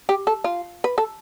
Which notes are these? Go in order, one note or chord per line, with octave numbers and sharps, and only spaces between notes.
G4
A4
F4
B4
A4